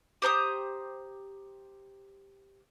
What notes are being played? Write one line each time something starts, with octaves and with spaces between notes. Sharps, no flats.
G4 C5 A#5 D#6